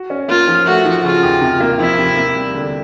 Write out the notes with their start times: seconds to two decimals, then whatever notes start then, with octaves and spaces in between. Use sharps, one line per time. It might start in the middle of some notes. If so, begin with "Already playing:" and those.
Already playing: F#4
0.10 C#4
0.29 A#3 F4
0.48 F3
0.66 A3 F#4
0.85 F3
1.04 C#3 F4
1.23 D#2
1.41 C3
1.60 A#3
1.79 F3 E4
1.98 C3
2.17 A#3
2.35 G3
2.54 D3